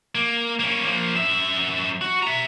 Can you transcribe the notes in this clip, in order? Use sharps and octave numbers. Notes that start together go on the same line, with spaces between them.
A#3
A#3 C#4
F3 A#3
F#2 E5
F#4
E5 A#5